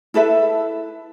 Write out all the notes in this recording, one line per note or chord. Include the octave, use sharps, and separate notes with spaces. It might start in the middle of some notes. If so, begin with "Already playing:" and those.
E4 A4 B4 E5